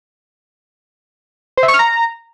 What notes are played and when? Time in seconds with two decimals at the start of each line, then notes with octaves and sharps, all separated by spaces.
1.57 C5
1.63 E5
1.68 C#6
1.74 F6
1.79 A#5